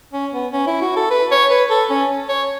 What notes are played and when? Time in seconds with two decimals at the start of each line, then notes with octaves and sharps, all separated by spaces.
0.13 C#4
0.33 B3
0.52 C#4
0.67 E4
0.81 F#4
0.97 A4
1.11 B4
1.31 C#5
1.50 B4
1.70 A4
1.90 C#4
2.29 C#5